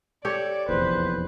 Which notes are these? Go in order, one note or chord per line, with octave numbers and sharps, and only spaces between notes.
G4 A4 C#5 D5
F1 A#1 E2 B4 C5